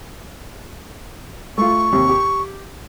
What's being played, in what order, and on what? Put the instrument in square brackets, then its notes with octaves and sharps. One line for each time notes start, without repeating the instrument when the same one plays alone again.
[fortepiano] A3 F4 [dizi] C#6
[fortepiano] D#2 C3
G4